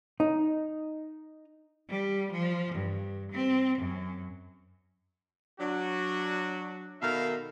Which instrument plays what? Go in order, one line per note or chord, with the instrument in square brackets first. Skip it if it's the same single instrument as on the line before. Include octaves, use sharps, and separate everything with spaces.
[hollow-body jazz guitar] D#4
[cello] G3
F3
G2
C4
F#2
[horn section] F#3 D4 F#4
B2 D#3 A4 A#4 E5 F5